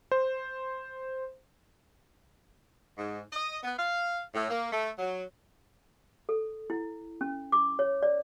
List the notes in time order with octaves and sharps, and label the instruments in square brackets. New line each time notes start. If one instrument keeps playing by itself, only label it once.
[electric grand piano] C5
[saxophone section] G#2
D#5
B3
F5
A2
A#3
A3
F#3
[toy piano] A4
E4
C#4
D6
C#5
D5